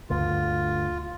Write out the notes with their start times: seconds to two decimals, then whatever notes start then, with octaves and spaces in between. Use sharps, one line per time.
0.10 D2 G2 D3 F4